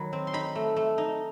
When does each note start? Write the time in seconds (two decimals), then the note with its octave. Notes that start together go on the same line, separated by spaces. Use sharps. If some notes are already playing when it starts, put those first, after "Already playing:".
Already playing: D#3 F#3 B5
0.13 C4
0.27 C6
0.33 D#4 B5
0.55 A3
0.76 A3
0.98 D#4